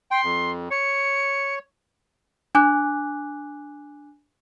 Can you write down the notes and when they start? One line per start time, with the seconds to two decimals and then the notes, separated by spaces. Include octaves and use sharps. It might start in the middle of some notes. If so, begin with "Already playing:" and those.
0.11 G5 C6
0.24 F2
0.71 C#5 C#7
2.55 D4 G#5 D6 F#6